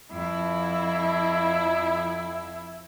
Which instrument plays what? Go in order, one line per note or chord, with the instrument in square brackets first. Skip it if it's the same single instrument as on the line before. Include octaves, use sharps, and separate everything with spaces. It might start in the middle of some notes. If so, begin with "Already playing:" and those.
[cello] F2 F3 [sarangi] E4